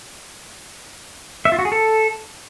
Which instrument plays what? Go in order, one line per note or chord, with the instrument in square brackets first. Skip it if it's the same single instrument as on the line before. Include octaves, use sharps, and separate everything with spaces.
[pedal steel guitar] E5
F4
F#4
G#4
A4